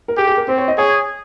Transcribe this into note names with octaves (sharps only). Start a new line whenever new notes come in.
A#4
G4 G#4
G#4
A#4
C4 C5
C#5
D#5
G#4 C#5